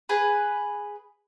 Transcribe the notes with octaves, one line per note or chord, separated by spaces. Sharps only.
G#4 B4